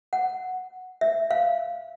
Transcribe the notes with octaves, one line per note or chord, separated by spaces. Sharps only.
F#5
E5
F5